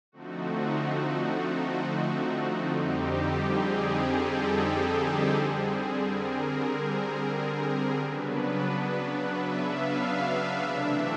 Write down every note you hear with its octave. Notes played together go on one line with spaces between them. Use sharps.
D3 F3 A3 C4 D#4 F#4
F2 D3 G3 C4 D#4 G4
G#4
A4
D3 G3 C4 G#4
A#4
C#3 F#3 B3 D4 B4
E5
F5
E5
C3 E3 A3 D4